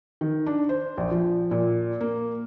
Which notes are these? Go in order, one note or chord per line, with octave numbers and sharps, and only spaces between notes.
D#3
D4
C5
A#1
F3
A#2
A#3